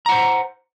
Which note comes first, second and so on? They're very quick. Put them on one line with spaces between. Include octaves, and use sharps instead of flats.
A#5 F#5 C5